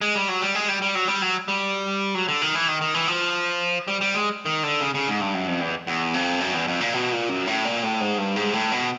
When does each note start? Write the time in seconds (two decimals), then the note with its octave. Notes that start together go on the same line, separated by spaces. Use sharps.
0.01 G#3
0.15 G3
0.29 F#3
0.42 G3
0.55 G#3
0.68 G3
0.82 G3
0.95 F#3
1.08 G3
1.22 F#3
1.48 G3
2.15 F#3
2.28 D3
2.41 D#3
2.55 E3
2.68 D#3
2.81 D#3
2.94 E3
3.08 F3
3.88 G3
4.01 G3
4.14 G#3
4.46 D#3
4.63 D3
4.81 C#3
4.94 C#3
5.08 G#2
5.21 G2
5.34 F#2
5.48 F2
5.61 E2
5.87 E2
6.14 F2
6.40 F#2
6.54 E2
6.67 F2
6.81 A#2
6.94 B2
7.12 A#2
7.29 F#2
7.47 A2
7.65 A#2
7.83 A2
8.00 G#2
8.18 G2
8.36 G#2
8.53 A2
8.72 B2